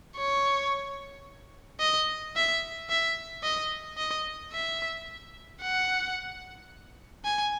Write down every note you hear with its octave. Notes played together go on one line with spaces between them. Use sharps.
C#5
D#5
E5
E5
D#5
D#5
E5
F#5
G#5